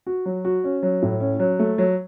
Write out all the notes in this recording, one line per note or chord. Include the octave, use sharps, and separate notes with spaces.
F#4
F#3
F#4
C#4
F#3
A2
C#4
F#3
A3
F#3